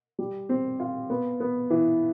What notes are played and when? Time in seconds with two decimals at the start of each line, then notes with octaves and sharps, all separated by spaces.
0.19 G3
0.49 C4
0.80 F4
1.10 B3
1.40 B3
1.70 E3